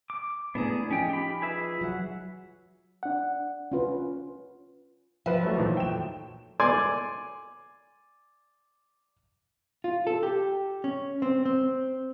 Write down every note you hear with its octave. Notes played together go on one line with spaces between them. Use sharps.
D6
A2 B3 D4 G#4 A#5
F3 C#4 D#4 F4 G5
G4 B5
G#4 B4 E5
F#3 F#5
D4 F#5
C#4 F4 B4
F3 B4 E5
F#3 A3
A#2 D#3 E3
G5 E7
D5 G#5 C6 D6
F4
A4
G4
C#4
C4
C4